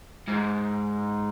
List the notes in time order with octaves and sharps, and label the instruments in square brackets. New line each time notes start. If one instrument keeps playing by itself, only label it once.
[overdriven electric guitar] G#2